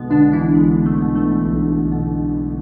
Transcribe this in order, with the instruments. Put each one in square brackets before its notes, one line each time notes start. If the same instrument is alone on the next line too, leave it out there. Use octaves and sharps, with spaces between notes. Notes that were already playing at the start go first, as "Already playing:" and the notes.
Already playing: [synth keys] B1 B2 G#3 B3
B2 D3 D4
E3 E4
B1 G#3
A3
B2
A3
B1
B2